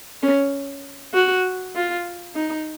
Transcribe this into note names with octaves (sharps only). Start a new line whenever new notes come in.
C#4
F#4
F4
D#4